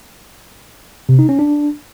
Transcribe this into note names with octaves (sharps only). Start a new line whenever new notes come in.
C3
D#4
C#4
D4